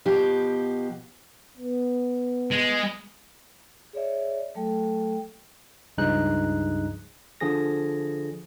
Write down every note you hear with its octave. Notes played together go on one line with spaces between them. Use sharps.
B2 F3 G4
B3
G#3
G#4 C#5 D5 E5
F#3 A3 A4 G5
C#2 G2 F3 D#4 G#4 F#6
D3 F3 G#4 A#6